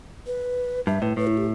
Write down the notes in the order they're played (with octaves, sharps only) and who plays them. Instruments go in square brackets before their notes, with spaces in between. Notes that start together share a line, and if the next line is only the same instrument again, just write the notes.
[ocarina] B4
[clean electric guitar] G2 [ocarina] E5
[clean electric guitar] A2 [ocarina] B4
[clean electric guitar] A2 [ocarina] B4
[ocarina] E4
G4